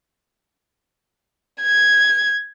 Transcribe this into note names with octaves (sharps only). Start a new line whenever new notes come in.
G#6